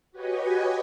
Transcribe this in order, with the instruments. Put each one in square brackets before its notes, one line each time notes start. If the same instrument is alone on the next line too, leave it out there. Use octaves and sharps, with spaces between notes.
[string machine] F#4 G4 B4 C#5 D#5 G#5